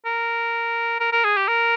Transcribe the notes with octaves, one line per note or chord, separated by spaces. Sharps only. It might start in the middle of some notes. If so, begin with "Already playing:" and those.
A#4
A#4
A#4
G#4
G4
A#4